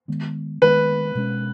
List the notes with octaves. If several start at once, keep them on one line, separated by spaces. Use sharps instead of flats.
D#3 G#3 B3
D#3 G#3 B3 B4
B2 G#3 C#4